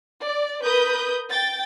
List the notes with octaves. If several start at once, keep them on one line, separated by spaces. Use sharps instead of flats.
D5
A#4 B4 D#6 G6
G5 A6